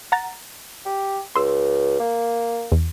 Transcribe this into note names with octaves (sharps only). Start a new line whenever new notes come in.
F#5 A#5 A6
G4
C#2 C6 E6
A#3
E2